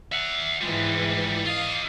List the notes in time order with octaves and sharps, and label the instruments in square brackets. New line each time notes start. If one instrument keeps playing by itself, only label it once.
[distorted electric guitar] E5 F#5
[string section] G#2 E3 F3 [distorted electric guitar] G3 G#3
[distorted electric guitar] F4 D#5 [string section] F5